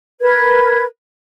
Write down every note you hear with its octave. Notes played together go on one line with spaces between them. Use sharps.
A#4 B4 G#6